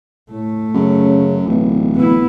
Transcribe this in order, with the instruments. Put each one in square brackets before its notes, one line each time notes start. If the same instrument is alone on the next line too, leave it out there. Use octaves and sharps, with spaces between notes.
[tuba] A2 [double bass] A3
[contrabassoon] F#2 [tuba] C#3 [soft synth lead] C#4
[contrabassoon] D1 [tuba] B1 [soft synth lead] E3
[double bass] B3 E4